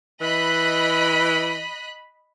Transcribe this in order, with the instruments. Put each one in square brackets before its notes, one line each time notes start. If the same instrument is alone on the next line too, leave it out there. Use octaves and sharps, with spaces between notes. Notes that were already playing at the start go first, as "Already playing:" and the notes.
[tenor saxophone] E3 [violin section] D#5 B5 F#6